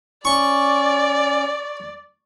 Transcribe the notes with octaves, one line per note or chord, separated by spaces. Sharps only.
C#4 D5 C#6